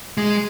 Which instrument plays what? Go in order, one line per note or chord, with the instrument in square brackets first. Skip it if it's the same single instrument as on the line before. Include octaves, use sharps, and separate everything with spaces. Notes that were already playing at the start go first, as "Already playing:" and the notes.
[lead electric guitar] G#3